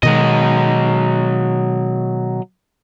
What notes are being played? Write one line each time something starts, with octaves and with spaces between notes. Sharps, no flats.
B2 D#3 F#3 G#3 D#5